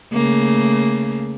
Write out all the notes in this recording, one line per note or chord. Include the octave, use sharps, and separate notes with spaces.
C#3 A3 A#3